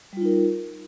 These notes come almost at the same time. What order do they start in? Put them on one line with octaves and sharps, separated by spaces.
G3 F4 D#4 A#4